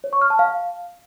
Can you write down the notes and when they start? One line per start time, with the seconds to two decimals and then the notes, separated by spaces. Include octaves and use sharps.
0.04 C#5
0.13 C#6
0.21 F6
0.30 A5
0.39 F5